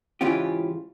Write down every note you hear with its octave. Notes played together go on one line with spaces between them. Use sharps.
G#2 C#3 E3 C#4 F4 G4